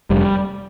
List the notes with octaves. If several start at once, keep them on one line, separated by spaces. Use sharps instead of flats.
F1 G3